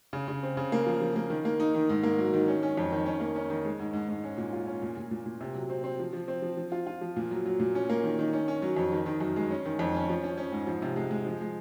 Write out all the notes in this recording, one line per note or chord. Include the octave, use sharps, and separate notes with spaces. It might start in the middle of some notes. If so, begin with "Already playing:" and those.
C#3
C#3
C4
C#3
A#3
F3
F3
A#3
D#3
A#3
D#4
D#3
G#2
A#3
F#3
D#3
C#4
C#4
F2
D#3
C#4
A#3
C#4
D#3
G#3
G#2
G#2
G#2
C#4
A#2
F4
C#4
A#2
A#2
A#2
A#2
C3
F#3
C4
C4
F3
F3
C4
F3
F3
F4
F4
F3
A#2
F#3
F#3
A#2
C#4
A#3
D#3
D#3
C#4
C#4
F#3
F2
D#3
D#3
F#2
G#3
C#4
D#3
F2
C#4
F3
C#4
C#4
G#2
F3
C3
G#3
G#3
F3
G#3